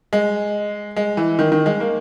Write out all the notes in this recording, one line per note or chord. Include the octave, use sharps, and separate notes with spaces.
G#3
G#3
E3
D#3
D#3
G#3
A#3